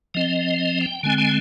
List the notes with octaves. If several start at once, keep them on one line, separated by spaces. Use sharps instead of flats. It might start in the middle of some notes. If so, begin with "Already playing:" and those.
F3 C4 D#5
D#5
G5
D3 G#3 C4 G#5
G#5